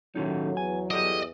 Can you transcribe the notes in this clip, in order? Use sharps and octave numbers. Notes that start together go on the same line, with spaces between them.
D#2 A2 D#3 F#3 C#4 D#4
E2 G#5
G4 A4 D5 D#5